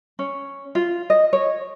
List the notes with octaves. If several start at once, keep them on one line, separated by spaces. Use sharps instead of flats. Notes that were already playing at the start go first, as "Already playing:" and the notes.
C#4
F4
D#5
C#5